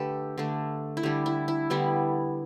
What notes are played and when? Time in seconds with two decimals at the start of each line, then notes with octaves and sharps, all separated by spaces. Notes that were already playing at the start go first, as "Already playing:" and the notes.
Already playing: D3 A3 D4 G4 A4 B4
0.38 D3 A3 D4
0.97 E4
1.03 D3 G3 D4 G4
1.26 E4
1.48 E4
1.70 D3 G3 B3 D4 E4